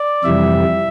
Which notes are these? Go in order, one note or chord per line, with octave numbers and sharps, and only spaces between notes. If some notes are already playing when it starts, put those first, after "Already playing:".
Already playing: D5
F2 C3 E3 G3 E5